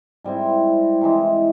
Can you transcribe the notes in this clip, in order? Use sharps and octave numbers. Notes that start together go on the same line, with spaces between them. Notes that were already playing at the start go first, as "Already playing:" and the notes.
G#2 G3 C4 E4
C3 E3 G#3